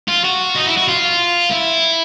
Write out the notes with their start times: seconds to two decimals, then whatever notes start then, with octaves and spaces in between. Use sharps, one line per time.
0.08 F4
0.24 F#4
0.55 D#4
0.66 E4
0.77 F#4
0.88 F4
1.51 E4